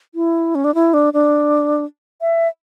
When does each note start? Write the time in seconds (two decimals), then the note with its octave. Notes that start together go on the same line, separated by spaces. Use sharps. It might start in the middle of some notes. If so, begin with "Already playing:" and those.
0.15 E4
0.55 C#4
0.64 D4
0.75 E4
0.94 D4
1.13 D4
2.21 E5